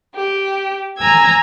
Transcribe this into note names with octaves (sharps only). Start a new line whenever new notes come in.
G4
G#5 A#5 E6 G#6